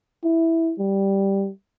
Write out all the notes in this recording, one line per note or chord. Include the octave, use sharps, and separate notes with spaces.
E4
G3